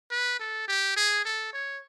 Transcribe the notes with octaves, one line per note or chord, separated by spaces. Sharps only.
B4
A4
G4
G#4
A4
C#5